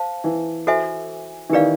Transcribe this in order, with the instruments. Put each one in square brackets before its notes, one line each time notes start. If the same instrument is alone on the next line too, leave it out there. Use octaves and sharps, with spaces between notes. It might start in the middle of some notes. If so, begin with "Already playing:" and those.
Already playing: [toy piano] C5 F5 A5
[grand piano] E3
[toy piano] F#4 A4 C5 E5 G#5
[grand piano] E3
[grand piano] D#3 [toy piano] G4 B4 D5 F5